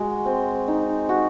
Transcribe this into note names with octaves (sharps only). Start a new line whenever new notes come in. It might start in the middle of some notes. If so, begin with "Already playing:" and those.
Already playing: G#3 F#4
C4
D#4
F#4